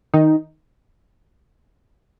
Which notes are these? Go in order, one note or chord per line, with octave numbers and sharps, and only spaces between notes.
D#3 D#4